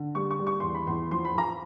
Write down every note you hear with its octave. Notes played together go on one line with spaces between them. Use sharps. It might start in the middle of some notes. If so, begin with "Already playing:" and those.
Already playing: D3
G3 C#6
C#6
G3
C#6
E2 C6
B5
E2 C6
F3 C6
B5
F3 A#5